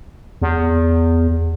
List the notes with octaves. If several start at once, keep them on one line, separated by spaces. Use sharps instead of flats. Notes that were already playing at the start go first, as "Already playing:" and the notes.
E2